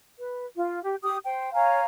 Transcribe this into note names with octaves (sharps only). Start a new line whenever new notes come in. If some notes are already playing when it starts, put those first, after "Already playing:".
B4
F4
G4
G4 D#6
C5 G5
C#5 F5 G#5 A#5